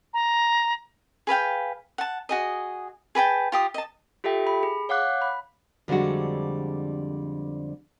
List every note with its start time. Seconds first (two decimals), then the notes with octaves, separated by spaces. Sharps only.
0.13 A#5
1.27 G#4 B4 F5 G5
1.98 F#5 A5
2.29 F#4 G#4 D#5
3.15 G#4 B4 G5 A5
3.52 F4 G4 D#6
3.74 D#5 A5
4.24 F4 G4 A4 E5 G5
4.47 B5
4.63 G#4
4.89 C#5 F5 F#5 D6 F#6
5.22 B5
5.88 F2 D3 G3 G#3 F#4